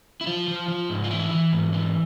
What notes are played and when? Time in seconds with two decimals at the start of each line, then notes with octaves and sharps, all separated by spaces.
0.21 E4
0.27 F3 F4
0.48 F3
0.68 F3
0.90 G#2
1.04 F4
1.10 E3 E4
1.31 E3
1.52 G#2
1.73 E3